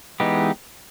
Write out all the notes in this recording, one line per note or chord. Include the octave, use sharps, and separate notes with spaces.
E3 G#3 B3 D#4 G4